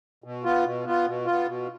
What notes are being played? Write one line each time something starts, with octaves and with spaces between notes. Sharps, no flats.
B2
B3 F4
B2
B3 F4
B2
B3 F4
B2